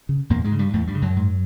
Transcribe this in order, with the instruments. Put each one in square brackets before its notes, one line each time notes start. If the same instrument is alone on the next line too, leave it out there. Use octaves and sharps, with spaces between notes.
[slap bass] C#3
E2 A#2 A#3
G#2 G#3
C#3
G2 G3
E2 A2 A3
G2 G3
C#3
F#2 F#3
G#2